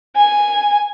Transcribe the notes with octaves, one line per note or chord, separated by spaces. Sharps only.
G#5